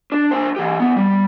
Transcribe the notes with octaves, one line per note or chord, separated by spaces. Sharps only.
D4
D4 C5
E3 G4
E2 B3
G3